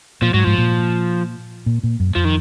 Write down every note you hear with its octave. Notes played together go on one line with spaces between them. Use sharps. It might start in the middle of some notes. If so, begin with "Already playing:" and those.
A#2 F3
G#2 F#3
G#2 F3
A#2
A#2
A#2
F#2
F2 F3
D#3